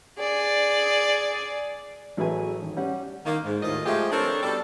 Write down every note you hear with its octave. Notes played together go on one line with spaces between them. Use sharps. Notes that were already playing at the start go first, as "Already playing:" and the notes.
G#4 D5
A1 F#3 G#4 A4 B4 G#5
G#1
G3 C#4 F#5
D#3 A#3
G#2
D#2 A2 D#3 F4 D#5
F3 G#3 A3 F4 G4 G#4
C4 D4 A4 A#4 C5 C#5
B2 G3 D4 A4